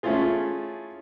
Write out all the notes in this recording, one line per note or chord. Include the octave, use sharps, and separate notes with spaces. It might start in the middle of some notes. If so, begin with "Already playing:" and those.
A3 C#4 E4 F4 G#4